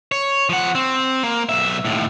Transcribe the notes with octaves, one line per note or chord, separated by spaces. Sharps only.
C#5
F3 F#5
C4
A#3
B1 E5
D#2 A2